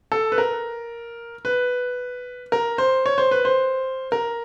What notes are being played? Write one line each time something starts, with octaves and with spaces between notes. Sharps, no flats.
A4
B4
A#4
B4
A#4
C5
C#5
C5
B4
C5
A#4